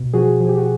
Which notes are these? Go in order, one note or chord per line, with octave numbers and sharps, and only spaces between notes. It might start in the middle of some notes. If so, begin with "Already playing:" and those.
Already playing: B2
F3 F#4 G#4
F3 G#4
G4
F#4 G#4